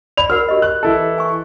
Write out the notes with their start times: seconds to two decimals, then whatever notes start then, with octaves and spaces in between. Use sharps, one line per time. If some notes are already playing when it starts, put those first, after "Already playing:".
0.17 D5 B5 F7
0.30 F#4 A#4 F#5 F6
0.48 F#4 G4 D#5
0.62 F#6
0.83 E3 E4 A4
1.18 G#5 C#6